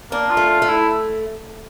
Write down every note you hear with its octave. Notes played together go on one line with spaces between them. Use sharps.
A#3 D4
F4
A3
F4
A3
E4